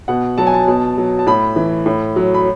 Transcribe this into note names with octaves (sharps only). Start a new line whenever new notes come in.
B2 F#5
F#3 A5
G#5
A5
B2
F#3
A5
A2 B5
E3
A2
F#3
B5